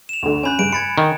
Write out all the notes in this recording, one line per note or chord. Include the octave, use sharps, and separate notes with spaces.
E7 F7
D2 D3
C#4 G#5 B5 F#6 G6
G2 C#3 D7
B5 G#6 A6 C#7
D#3